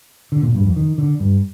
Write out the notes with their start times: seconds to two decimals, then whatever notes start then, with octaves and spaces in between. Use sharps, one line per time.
0.32 D3
0.42 A#2
0.55 G2
0.65 F2
0.76 D#3
0.98 D3
1.20 G2